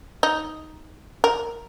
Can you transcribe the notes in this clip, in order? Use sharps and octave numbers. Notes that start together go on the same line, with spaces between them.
D#4
A#4